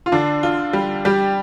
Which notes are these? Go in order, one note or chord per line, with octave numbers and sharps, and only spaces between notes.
F4
D3 D4
F4
G3
G3 G4